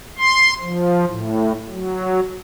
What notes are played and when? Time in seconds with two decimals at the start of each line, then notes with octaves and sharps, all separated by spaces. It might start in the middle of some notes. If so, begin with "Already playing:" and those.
0.18 C6
0.61 F3
1.08 A2
1.69 F#3